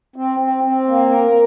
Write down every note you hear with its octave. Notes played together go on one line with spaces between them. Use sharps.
C4
C4
C4
A#3
A#4